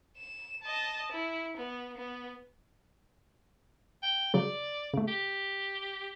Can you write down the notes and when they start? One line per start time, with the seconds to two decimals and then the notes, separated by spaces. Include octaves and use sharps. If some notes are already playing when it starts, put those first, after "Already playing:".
0.18 E7
0.63 D#5 A5
1.12 E4
1.57 B3
1.97 B3
4.03 G5
4.34 C#3 F#3 D5
4.94 C#3 A3
5.08 G4